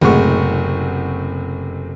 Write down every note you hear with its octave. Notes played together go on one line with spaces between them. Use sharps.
F#1 A2 C3 G#3 F#5 C#6